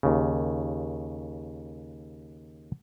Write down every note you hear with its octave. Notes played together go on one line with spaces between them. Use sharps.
D#2 C#3